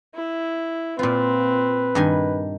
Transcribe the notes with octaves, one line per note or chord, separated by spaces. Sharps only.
E4
A#2 C4 F4 B4
G2 D#3 G#5